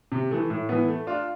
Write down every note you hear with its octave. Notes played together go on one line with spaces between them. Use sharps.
C3
E3 A3
A2
E3 B3
A3
D4 F4